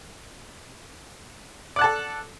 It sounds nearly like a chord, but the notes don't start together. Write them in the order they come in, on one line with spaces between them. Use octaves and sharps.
D5 F#5 A5 A4